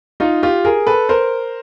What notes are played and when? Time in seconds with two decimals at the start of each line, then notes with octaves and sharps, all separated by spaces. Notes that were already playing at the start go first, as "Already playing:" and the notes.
0.20 D#4 F4
0.43 F4 G4
0.65 G#4 A#4
0.87 A4 B4
1.09 A#4 C5